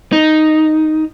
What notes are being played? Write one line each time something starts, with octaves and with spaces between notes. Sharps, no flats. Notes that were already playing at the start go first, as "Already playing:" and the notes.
D#4